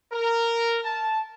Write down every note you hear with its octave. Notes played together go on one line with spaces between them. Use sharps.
A#4
A5